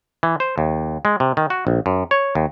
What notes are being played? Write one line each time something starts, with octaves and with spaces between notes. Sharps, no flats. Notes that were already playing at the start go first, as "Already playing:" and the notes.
E3
C5
D#2
G#3
C3
D#3
F#4
A#1
F#2
C#5
D#2